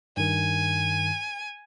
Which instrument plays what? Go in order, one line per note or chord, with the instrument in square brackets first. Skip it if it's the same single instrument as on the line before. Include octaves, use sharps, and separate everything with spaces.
[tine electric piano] G2 D#3 [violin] G#5